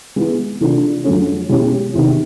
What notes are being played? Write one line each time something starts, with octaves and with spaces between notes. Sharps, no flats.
G#3 B3 E4
C3 E3 A3 D4 F4
F2 D3 F#3 A3 C#4
B2 G#3 C#4 E4 G4
E2 C3 D#3